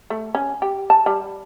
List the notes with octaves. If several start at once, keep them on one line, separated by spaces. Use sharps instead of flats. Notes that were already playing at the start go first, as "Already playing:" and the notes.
A3
C#4
G4
A5
G3